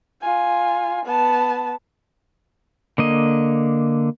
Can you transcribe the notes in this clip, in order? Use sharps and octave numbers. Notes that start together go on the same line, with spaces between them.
F4 G#5
B3 A5
D3 A#3 D#5